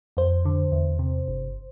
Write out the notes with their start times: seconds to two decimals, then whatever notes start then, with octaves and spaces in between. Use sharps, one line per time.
0.17 F2 C5
0.45 D3
0.72 E2
0.99 C3
1.28 G1